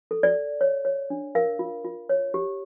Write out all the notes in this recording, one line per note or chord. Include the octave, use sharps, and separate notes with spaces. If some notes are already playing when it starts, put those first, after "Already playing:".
A4
D5
A4
C#5
C#5
D4
A#4 F5
F4
F4
C#5
G4